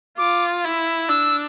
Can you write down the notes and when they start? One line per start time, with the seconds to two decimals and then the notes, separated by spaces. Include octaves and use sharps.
0.18 F4 D6
0.64 E4
1.09 D4 E6